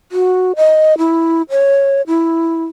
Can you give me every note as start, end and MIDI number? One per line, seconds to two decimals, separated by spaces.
0.12 0.52 66
0.56 0.98 75
0.98 1.42 64
1.50 2.02 73
2.07 2.64 64